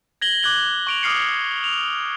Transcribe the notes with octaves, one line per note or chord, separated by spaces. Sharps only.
G#6 A#6 F#7 G7
D6 F#6 G#6 F#7 G7
C#6 D7 F7
D6 D#6 F6 C7 C#7
F7